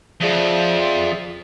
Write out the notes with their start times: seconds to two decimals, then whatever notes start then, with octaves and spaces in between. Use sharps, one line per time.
0.21 F2 F3 G#4 D5 E5